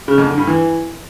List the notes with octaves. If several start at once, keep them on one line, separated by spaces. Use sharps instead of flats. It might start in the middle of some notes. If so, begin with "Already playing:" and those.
C#3
F2
D3
G2
E3